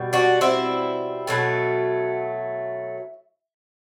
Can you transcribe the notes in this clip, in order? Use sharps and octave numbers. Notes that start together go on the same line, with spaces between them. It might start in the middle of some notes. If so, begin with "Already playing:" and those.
Already playing: B2 G3
D4 F#4
C4 E4
B2 F#3 A3